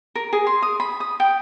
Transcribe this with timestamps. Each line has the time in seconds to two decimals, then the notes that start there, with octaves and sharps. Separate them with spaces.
0.15 A#4
0.33 G#4
0.47 C6
0.62 D#6
0.80 B5
1.00 D#6
1.20 G5